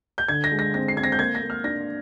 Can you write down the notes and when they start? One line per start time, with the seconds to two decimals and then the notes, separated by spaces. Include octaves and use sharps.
0.18 G6
0.28 D3 G#6
0.44 A#6
0.52 G#3
0.59 A#6
0.74 C4 A#6
0.88 C7
0.97 C4 G#6
1.04 A#6
1.12 G6
1.19 A#3 G#6
1.35 A#6
1.42 A#3
1.50 F6
1.64 D4 A#6